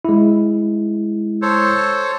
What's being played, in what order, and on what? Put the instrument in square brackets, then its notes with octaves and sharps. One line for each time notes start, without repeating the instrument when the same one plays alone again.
[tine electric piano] G#3 E4
[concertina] A4 C5 C#5